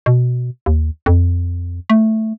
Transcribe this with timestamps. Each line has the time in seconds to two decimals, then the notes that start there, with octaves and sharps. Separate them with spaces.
0.06 B2
0.66 D#2
1.06 F2
1.90 A3